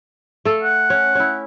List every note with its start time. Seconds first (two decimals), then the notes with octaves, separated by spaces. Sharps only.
0.45 A3 A4 F5
0.63 F#5
0.90 C#4
1.15 C#4 E4